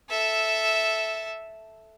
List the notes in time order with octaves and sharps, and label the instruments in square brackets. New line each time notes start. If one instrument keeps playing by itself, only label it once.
[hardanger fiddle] A4 E5